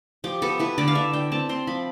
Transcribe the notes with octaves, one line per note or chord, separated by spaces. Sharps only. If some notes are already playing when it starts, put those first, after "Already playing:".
F3 G4
B3 A4
E4 B4
D3 D5
F5
D3 E5
D3 G5
C4 A5
C4 C6
F3 B5